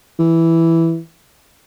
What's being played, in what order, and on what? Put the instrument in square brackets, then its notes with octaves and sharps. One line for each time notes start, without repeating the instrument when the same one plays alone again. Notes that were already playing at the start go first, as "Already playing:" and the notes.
[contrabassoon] E3